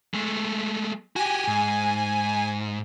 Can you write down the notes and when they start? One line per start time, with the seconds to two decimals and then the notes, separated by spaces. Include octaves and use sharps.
0.14 G#3 A3
1.16 F#4 G4 G#5
1.48 G#2